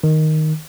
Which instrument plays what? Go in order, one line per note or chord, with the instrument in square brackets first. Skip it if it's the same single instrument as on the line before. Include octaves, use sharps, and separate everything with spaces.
[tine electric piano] D#3